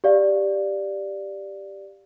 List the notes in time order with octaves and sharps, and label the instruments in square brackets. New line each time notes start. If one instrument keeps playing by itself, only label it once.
[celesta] G4 D5 F5